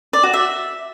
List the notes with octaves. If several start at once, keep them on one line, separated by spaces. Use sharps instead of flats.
D5
F#4
E5